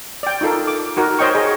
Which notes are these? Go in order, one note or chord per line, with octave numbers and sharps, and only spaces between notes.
D5 G5
D#4 F4 A4 A#4
D6
D#4 F#4 A#4
C5 C#5 D#5 G5 C#6
G#4 C#5 D#5